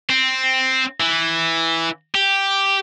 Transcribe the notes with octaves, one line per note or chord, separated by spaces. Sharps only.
C4
E3
G4